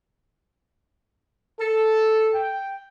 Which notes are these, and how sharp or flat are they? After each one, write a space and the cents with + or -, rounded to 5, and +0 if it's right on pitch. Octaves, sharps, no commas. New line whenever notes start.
A4 -5
G5 +0